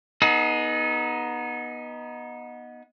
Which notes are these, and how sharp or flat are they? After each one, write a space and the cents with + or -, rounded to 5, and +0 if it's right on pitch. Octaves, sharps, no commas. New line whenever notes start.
B3 -20 D#4 +0 G#4 +40